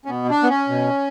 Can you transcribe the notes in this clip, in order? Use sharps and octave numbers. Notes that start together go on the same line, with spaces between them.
C#4
B2 B3
D4
B3
C#4
B2